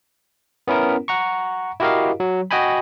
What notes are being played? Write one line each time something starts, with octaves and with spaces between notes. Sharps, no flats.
B3 C#4 E4 A#4
F#5 A#5 C#6
E4 F#4 G4 A#4 D#5 F5
F#3
F#4 D#5 G5 G#5 B5